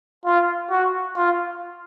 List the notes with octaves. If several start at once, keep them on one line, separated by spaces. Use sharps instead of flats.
F4
F#4
F4